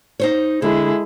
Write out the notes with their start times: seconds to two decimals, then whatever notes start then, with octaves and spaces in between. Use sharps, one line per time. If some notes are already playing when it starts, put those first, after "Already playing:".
0.20 D#4 C5 C#5
0.62 D3 G#3 E4